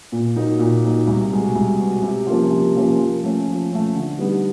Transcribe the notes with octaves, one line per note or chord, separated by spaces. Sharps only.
A#2
F#3 A#3 D#4
A#2
F#3 A#3 D#4
C2
B2 G#3
C2
B2 G#3
C3
F3 A#3 C#4 F4
C3
F3 A#3 C#4 F4
F3
A3 C#4
F3
A3 C#4
D3
G3 B3 D#4 G4